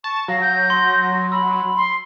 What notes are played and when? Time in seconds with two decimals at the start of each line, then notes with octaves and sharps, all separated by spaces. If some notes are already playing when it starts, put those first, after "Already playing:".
0.04 A5 C#6
0.28 F#3 F5 A#6
0.42 G6
0.70 C6
1.32 B5 E6
1.77 C6